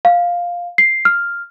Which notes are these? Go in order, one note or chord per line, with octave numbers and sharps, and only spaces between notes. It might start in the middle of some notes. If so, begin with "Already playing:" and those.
F5
C7
F6